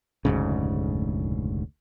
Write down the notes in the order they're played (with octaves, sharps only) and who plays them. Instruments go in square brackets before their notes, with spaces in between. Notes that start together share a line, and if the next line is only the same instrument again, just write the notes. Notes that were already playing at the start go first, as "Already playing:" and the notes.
[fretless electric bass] F1 D2 G#2 C#3